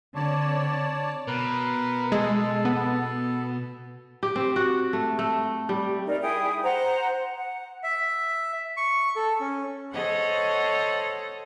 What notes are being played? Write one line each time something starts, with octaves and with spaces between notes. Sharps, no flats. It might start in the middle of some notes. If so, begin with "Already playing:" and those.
D3 C4 C#5 D5 A5
B2 A#4 B4
G#3 A4 A5
B3
G4
C4
F#4
A3
A3
G3
D#4 A#4 D5
E4 G#4 G5 D#6
C5 F#5 A#5
F#5
E5
C#6
A4
C#4
A4 C5 C#5 D#5 F#5